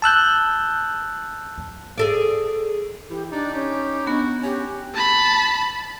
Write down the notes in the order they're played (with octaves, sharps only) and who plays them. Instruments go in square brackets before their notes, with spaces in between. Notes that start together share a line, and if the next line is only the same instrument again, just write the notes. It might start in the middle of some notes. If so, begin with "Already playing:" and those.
[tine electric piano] A5 E6 F#6 G6
[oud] G#4 A4 D5
[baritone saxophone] E3 [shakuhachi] G4
[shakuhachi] D4 [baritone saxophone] D#4 [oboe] D5
[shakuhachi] C#4 [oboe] G4
[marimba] B3 D4 [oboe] F#4
[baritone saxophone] C#4 [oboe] F#4 [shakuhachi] G4
[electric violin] A5 B5